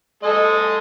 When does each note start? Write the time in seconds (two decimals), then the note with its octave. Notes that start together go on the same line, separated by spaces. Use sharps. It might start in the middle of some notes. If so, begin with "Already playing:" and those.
0.23 G#3 A4 D#5